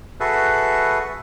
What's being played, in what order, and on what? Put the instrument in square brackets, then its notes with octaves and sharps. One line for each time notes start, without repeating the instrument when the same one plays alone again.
[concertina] F#4 G#4 A4 B4 E5